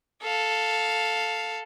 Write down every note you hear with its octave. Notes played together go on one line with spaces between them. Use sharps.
A4 F5